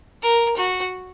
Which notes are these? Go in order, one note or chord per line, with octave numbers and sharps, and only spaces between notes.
A#4
F#4